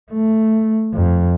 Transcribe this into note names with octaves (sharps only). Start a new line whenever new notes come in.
A3
F2